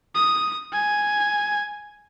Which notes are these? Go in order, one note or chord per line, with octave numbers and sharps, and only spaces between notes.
D#6
G#5